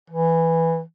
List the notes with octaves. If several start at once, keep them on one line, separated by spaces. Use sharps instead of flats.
E3